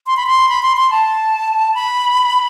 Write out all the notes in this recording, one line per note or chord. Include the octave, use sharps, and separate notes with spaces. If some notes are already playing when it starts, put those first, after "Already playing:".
C6
B5
C6
B5
C6
C6
A5
B5